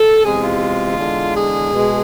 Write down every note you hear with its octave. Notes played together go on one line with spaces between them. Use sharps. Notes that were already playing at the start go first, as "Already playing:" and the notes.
Already playing: A4
E2 C3 G#3 G#4
F4
E2 D3 G#3
G#4
B2 G#3